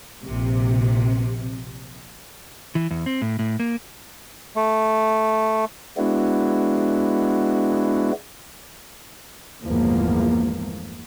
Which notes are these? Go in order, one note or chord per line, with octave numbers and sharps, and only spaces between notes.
A#1 C3
E3
E2
C4
A2
A2
A#3
A3
G#3 B3 D4 E4 F#4
G1 E2 A2 F3 G#3 A#3